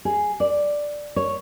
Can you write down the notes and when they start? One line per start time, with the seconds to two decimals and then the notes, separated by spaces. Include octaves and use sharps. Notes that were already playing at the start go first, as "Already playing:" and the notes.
0.05 G#4
0.40 D5
1.16 C#5